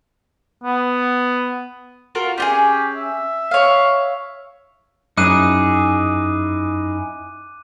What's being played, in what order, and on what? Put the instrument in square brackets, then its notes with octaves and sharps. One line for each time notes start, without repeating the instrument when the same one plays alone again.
[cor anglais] B3
[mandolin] F4 F#4 A#4
[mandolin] C#4 F4 G#4 [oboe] G4
[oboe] E5
[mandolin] C#5 F5
[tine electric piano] F#2 [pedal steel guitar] D#4 E4 G#4 [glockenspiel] D6 F#6 D#7